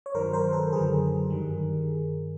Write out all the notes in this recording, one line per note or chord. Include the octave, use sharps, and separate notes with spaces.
C#5
G2 D#3 F#3 A#4 C5
A#4 C5
A4 B4
F#2 D3 F#3 G#4 A#4
G2 D#3 G3